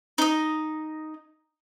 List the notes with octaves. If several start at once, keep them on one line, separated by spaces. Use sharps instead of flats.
D#4 D#5